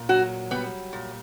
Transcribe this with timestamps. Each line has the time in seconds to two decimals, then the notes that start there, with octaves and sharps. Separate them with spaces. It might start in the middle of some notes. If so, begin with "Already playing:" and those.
Already playing: A#2
0.09 F#3 F#4
0.51 G3 B3
0.93 A#2